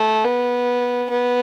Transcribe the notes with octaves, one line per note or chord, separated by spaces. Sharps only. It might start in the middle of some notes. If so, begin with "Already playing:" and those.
Already playing: A3
B3
B3